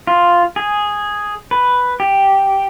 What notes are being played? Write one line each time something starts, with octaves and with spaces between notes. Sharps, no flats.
F4
G#4
B4
G4